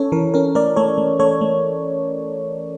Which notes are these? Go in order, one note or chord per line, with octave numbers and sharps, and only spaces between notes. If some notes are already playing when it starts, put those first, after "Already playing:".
Already playing: C#4 A4 C#5
E3 A#4
C#4 A#4
A3 A#4 D5
A3 A4 C#5
A3
A3 A4 C#5
A3